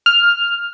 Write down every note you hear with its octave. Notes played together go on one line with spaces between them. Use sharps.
F6